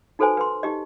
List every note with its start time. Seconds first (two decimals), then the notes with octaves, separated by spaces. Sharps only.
0.19 D#4 F#4 A4 B4 C5 G#5
0.37 B4 C6
0.63 D#4 G4 D#5